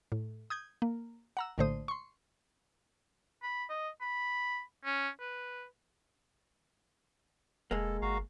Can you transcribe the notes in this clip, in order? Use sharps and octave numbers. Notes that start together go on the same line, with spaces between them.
A2
D#6 G6 G#6
A#3
F#5 A#5 E6
A#1 A2 D3 A3 C5 D#6
C6 C#6
B5
D#5
B5
C#4
B4
E1 G#3 A#3 A4
G1 F#4 F5 A#5